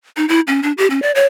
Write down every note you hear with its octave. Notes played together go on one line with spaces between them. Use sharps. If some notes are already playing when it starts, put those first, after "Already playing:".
D#4
E4
C#4
D4
G4
C#4
D5
C#5